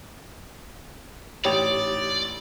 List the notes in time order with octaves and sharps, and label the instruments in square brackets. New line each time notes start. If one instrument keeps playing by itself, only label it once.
[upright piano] A1 F7 [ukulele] D#4 G4 C#5 [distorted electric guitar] D5